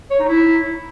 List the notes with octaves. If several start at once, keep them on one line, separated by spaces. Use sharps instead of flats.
C#5
D#4
E4